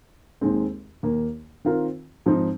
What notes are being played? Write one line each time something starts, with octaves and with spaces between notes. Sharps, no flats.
D#2 D#3 G#3 C4
D#2 D#3 A#3
D#3 C4 F4 A#4
G#2 F3 C4 D#4